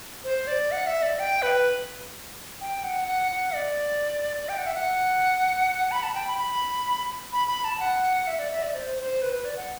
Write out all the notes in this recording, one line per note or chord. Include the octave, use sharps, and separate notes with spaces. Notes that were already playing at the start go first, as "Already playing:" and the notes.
C5
D5
F#5
E5
D5
G5
B4
G5
F#5
F#5
F#5
D5
G5
F#5
E5
F#5
B5
A5
G5
B5
B5
B5
B5
A5
F#5
E5
D5
E5
D5
C5
C5
B4
B4
D5
F#5